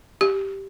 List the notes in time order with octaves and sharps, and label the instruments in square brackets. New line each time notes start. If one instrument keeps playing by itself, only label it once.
[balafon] G4